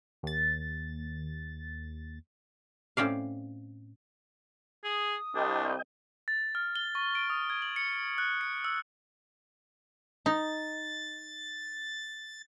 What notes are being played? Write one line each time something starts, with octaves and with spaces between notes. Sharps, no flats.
D#2 A6
A2 C4 C#4 D5 F5
G#4 D#6
C2 D4 D#5 G5
A6
F6
G7
C#6
D7
D#6
G#6
F#7
C#7
F#6
C#7
E6
D#4 A6